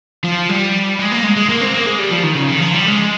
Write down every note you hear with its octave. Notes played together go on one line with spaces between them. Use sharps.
F3
G3
G#3
A#3
G#3
G#3
A#3
C4
A#3
G#3
G3
F3
D#3
C#3
D#3
F3
G3
G#3